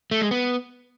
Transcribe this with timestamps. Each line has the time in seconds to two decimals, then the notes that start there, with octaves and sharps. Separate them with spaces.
0.11 A3
0.21 G#3
0.31 B3